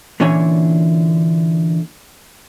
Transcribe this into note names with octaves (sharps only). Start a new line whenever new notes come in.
A#2 D3 E3 C#4 C#5 G#5